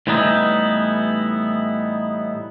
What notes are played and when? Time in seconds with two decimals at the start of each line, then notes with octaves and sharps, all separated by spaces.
0.07 A2 E3 G3 B3 D#4 E4